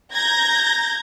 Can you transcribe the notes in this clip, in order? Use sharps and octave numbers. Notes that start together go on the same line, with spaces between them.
A#5 G6 G#6 A#6